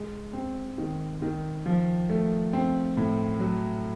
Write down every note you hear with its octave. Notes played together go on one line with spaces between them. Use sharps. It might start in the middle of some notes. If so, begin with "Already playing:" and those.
Already playing: G#3
C4
D#3
D#3
F3
A3
C4
A2
F#3